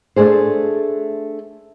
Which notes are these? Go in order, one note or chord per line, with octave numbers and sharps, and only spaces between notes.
A3 D4 G#4 C5